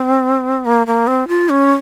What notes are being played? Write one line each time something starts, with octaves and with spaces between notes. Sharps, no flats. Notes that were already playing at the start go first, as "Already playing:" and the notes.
Already playing: C4
A#3
A#3
C4
F4
C#4